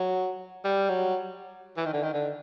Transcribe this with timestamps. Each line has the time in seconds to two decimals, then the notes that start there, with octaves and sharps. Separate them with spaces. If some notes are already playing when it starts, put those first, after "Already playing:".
Already playing: F#3
0.64 G3
0.89 F#3
1.77 E3
1.85 D#3
1.93 D3
2.03 D#3
2.13 D3